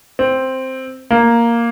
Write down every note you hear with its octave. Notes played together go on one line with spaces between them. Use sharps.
C4
A#3